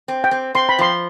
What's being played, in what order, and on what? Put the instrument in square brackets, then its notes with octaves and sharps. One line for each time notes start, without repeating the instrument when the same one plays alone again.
[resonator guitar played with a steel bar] C4
[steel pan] G5
[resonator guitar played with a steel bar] C4
[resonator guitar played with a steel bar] C4 [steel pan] C6
[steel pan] B5
[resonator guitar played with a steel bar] F3 [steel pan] C6